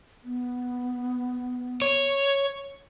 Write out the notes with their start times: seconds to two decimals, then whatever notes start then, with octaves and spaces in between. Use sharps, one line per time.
0.24 B3
1.82 C#5